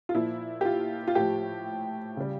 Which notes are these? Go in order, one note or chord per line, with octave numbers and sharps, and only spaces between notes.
F4
A#2 F3 E4
G4
F4
F4
A2 F3 G4
C#3 G3